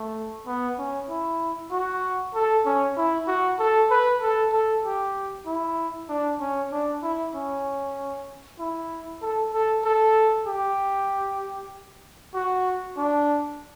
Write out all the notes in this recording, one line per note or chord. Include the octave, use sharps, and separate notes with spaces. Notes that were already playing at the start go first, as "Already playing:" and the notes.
Already playing: A3
B3
C#4
E4
F#4
A4
C#4
E4
F#4
A4
B4
A4
A4
G4
E4
D4
C#4
D4
E4
C#4
E4
A4
A4
A4
G4
F#4
D4